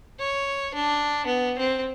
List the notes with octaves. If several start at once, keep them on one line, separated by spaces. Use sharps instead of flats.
C#5
D4
B3
C4